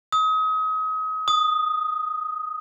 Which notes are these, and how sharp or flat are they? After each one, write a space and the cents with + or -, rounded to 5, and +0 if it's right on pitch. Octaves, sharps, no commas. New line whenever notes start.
D#6 +35
D#6 -5